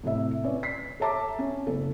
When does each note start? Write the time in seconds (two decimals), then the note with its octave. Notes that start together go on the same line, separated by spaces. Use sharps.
0.04 A2 C3 E5
0.44 C#4 B4 D5
0.63 B6 C7
1.00 A4 C#5 E5 A5 A#5 D6
1.39 C#4
1.67 F#1 A4